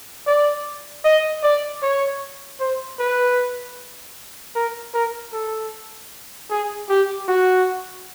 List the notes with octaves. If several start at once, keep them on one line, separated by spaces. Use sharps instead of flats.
D5
D#5
D5
C#5
C5
B4
A#4
A#4
A4
G#4
G4
F#4